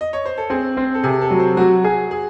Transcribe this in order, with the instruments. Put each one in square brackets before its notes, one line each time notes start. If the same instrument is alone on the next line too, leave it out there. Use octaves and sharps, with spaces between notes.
[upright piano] D#5
C#5
C5
A4
[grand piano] C4 [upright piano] G#4
[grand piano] C4
[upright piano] A4
[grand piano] C3 [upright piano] G#4
[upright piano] A4
[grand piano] F#3
[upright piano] C5
[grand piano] F#3 [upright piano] F#4
[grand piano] G#4
[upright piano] G#4